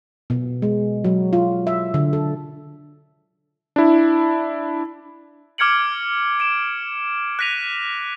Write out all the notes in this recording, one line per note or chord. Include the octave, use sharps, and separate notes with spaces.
B2
G#3
F#3
F4
E5
D3
A4
D4 E4
D6 F6 G#6 C#7 D7 F#7
D7 E7
F#6 A#6 B6 D#7 F7